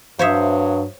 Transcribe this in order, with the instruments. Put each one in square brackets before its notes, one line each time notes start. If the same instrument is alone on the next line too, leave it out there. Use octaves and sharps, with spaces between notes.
[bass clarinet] G2 [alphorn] F#3 [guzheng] C5 C#5 E5 [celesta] F5 D#6